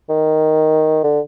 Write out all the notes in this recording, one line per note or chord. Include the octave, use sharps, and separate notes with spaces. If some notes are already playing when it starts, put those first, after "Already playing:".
D#3
D3